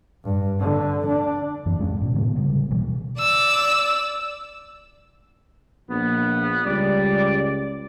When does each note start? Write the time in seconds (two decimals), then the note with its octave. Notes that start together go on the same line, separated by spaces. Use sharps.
0.24 G2
0.59 D3
1.08 D4
1.66 F#2 E3
1.79 D1 G#3 C#4
2.02 G#2 B2
2.15 A2 D3 G#3 B3
2.35 D1 D2 C#3 G3
2.71 D#1 B2 E3 G3
3.19 D5 E6
5.90 A#1 B3
6.66 C#2 G3 D5